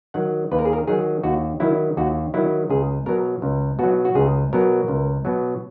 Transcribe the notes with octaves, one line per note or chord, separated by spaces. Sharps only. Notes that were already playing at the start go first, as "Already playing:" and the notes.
D#3 F#3 F#5
D#2 B4
A#4
G#4
A#4
D#3 F#3 G#4
D#2 F#4
D#3 F#3 E4
D#2 F#4
D#3 F#3 E4
C#2 G#4
B2 F#3 A#4
C#2
B2 F#3 F#4
F#4
C#2 G#4
B2 F#3 A#4
C#2
B2 F#3